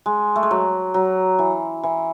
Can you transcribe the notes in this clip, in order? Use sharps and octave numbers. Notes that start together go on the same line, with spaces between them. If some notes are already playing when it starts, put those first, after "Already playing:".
G#3
A3
G#3
F#3
F#3
E3
E3